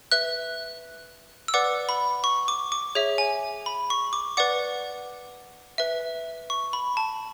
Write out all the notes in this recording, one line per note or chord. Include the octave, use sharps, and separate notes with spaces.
B4 E5 F#6
E6
B4 D5 F#5 D6
B5
C#6
D6
D6
G#4 C#5 E5
G#5
B5
C#6
D6
B4 D5 F#5 D6
B4 E5
C#6
B5
A5